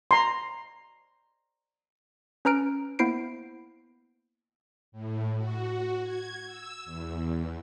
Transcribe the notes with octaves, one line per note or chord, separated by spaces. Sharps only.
A#5 C6
C#4 B4 A#5 F6 D7
A#3 B3 E4 C5 C7 D7
A2
F#4
G#6
E6
E2